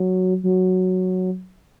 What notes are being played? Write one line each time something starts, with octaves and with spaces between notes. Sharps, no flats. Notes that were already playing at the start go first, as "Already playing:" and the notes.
Already playing: F#3
F#3